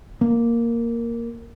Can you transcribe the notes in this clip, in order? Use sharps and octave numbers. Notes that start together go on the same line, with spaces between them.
A#3